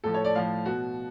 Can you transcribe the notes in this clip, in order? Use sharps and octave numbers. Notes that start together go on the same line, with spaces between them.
A2 F3 A4
C#5
D5
A2 F3 F5
B2 F#4